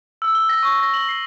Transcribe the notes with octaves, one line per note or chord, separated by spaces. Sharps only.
E6
G7
A#6
C#6
A#6
F#7
C7